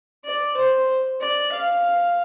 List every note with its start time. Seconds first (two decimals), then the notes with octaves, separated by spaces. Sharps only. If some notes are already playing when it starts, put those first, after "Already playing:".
0.25 D5
0.57 C5
1.21 D5
1.52 F5